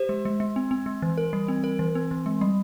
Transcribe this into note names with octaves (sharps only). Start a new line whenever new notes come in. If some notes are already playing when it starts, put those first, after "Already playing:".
Already playing: G4 C5
G#3
G#3
G#3
C4
C4
G#3
E3
A#4
G3
C4
A#4
E3
C4
E3
G#3
G3